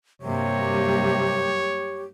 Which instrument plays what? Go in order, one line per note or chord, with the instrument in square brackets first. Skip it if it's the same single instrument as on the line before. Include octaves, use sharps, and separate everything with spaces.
[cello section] G2 F#3 A#3 [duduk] C3 [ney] G4 [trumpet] C#5